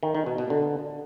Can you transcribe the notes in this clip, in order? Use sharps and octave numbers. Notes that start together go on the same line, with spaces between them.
D#3
D#3
B2
B2
D3